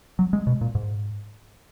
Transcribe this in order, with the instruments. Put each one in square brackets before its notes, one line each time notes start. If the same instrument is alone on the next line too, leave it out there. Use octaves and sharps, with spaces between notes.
[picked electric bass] F#3
G#3
B2
A#2
G#2